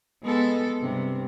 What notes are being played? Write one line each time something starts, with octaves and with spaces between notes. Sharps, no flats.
G#3 B3 A4
G2 C3